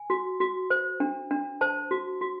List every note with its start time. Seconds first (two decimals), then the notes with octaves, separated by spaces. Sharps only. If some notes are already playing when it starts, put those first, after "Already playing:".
Already playing: G#5
0.10 F#4
0.40 F#4
0.70 C5
1.00 D4
1.31 D4
1.61 C5 A5
1.91 F#4
2.21 F#4